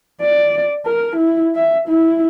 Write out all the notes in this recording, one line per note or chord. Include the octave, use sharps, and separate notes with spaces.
D5
A#4
E4
E5
E4